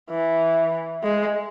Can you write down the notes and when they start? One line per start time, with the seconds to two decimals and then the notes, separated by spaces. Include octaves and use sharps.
0.10 E3
1.03 G#3